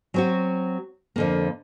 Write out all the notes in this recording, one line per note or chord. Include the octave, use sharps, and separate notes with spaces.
F#3 C4 F#4
F2 D3 A#3